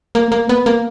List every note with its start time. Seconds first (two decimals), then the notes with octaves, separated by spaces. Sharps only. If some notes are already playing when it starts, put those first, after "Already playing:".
0.15 A#3
0.32 A#3
0.49 B3
0.66 A#3